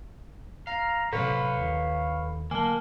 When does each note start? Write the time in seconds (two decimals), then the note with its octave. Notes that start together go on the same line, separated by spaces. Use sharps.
0.67 F5 A#5
1.13 A2 C3 F#3 A4 B4 C#5 F5
1.57 D#2 D#3
2.51 D3 F#3 A#3 G#5 A5